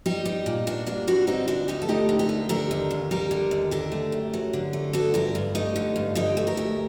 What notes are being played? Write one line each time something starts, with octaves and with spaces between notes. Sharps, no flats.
G3 D#4 G4
G3
A#2
A#2 D4 F#4
G3 A#3 D4
G3 D4 F#4
D3 C4 D#4
D2 D4 F#4
D2 D#4 G4
A4
A3 D#4 G4
D3
G4 A#4
D2
D3 G4 A#4
D#2
D#2
G3 G4 A#4
D3
D#2
D3 G4 A#4
A3
F#2
F#3
D3
A3
D3 F#4 A4
G2 G4 A#4
G2
A3 D#4 G4
D3
G2
D3 D#4 G4
A3
G4 A#4
D2